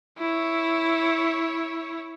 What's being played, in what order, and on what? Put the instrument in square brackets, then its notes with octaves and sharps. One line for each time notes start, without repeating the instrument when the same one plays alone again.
[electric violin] E4 C#5